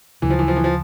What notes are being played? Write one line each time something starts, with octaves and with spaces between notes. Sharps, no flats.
D2 C#3 E3 F#3
F3
E3
F3
E3
F3